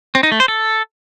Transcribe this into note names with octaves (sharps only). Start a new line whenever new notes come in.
C4
D#4
A3
C5
A4